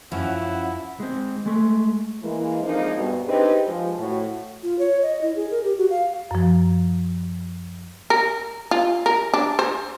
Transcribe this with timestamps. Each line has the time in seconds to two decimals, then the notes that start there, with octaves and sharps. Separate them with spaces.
0.12 F#2 F3 C#4 E4 F#5
1.00 G#3 C4
1.46 G#3 A3
2.23 E3 G#3 A#3
2.63 D3 F3 G#3 A#3 C4 D#4
2.96 G2 B2
3.27 C4 D4 D#4 G4 G#4 B4
3.68 F3 G#3
3.97 A2 F#4
4.63 F4
4.79 C#5
5.02 D#5
5.22 E4
5.36 G#4
5.51 A#4
5.63 G4
5.77 F#4
5.90 F5
6.31 F#2 F3
8.10 A#4
8.71 F4
9.06 A#4
9.34 D4
9.59 C5